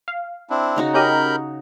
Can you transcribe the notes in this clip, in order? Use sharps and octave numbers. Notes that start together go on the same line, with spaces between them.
F5
C4 D4 E4
C#3 D#4 F#4
C#4 G4 A#4 D#5 B5 G6